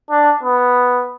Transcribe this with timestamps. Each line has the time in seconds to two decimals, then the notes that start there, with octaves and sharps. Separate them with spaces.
0.10 D4
0.43 B3